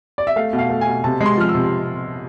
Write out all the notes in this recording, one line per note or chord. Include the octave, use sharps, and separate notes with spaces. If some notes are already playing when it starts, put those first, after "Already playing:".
D5
E5
A3 F5
B2
F5
A3
G#5
B2
C3 A5
G#3
C6
F3 F6
E6
C3